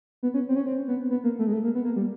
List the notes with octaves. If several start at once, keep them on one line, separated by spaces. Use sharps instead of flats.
B3
C#4
C4
C#4
C4
B3
B3
A#3
A3
G#3
A3
A#3
B3
A#3
G3